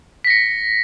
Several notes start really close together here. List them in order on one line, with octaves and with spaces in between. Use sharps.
B6 A#6 C#7